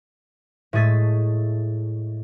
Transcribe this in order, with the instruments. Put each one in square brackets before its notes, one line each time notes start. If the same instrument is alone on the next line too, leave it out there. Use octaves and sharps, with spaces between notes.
[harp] A2 G#3 A3 G#4 A6 B6